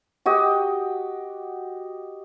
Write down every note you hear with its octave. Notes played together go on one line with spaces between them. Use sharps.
F#4 G4 D#5